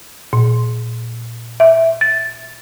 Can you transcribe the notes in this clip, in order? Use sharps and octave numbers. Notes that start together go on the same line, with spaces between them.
A#2
E5
A6